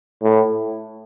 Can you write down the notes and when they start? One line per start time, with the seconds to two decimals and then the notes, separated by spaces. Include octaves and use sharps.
0.23 A2